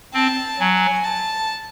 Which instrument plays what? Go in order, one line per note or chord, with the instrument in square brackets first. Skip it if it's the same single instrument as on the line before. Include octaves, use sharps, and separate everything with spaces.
[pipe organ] C4 [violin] A5
[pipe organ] F#3 [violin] G#5
[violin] A5